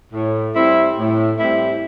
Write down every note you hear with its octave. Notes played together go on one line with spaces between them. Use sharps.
A2
G3 C4 E4
A2
G3 C4 E4